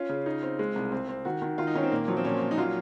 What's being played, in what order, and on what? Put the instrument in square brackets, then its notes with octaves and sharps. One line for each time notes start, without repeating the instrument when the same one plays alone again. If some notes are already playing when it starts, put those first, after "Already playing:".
Already playing: [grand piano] C#4 [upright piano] F4
[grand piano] C#3
D#4
C4
G#3
C2
C4
C4
[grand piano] D#3 [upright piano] F#4
[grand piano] D#3
[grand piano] D#3 [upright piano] F4
[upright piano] D#4
[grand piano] D#3 [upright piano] C#4
[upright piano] C4
[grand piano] A#2 [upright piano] A#3
[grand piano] F3 [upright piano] F#3
[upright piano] C4
[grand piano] A#2 [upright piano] C#4
[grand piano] A#2
[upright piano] D#4
[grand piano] F#3 [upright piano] F4